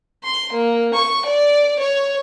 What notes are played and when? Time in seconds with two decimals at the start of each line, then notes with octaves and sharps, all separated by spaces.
0.24 C6
0.53 A#3
0.94 C#6
1.25 D5
1.79 C#5